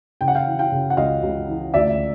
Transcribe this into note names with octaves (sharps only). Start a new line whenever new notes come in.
C#3 G5
F#5
F5 G5
E3
F5 G5
C#3
F#5
C#2 D#5 F5
C#2
E3
D2 D5 E5